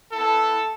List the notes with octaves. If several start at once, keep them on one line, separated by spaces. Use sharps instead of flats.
B3 E4 A4